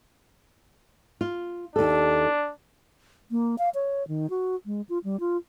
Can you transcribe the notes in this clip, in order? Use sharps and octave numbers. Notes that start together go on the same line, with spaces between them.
F4
D#2 D4 A4
A#3
F5
C#5
D#3
F#4
G#3
F4
G3
F4